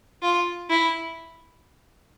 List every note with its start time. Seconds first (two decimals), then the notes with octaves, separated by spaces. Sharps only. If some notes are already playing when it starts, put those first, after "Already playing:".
0.22 F4
0.70 E4